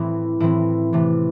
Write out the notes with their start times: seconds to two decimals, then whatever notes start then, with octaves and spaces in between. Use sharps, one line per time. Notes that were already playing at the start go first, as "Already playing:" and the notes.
Already playing: A2 E3 C4 E4
0.40 A2 E3 C4 E4
0.93 C3 E3 A3